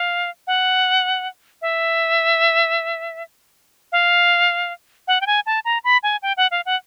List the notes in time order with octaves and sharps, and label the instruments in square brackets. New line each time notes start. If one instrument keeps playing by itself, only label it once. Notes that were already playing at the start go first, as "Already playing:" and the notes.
Already playing: [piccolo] F5
F#5
E5
F5
F#5
G5
G#5
A5
A#5
B5
G#5
G5
F#5
F5
F#5